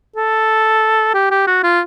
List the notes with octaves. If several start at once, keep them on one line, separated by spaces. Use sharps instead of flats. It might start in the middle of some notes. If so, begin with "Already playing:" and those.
A4
G4
G4
F#4
F4